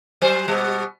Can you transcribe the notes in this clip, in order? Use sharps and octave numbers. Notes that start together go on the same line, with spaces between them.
F#3 C5
B2 G3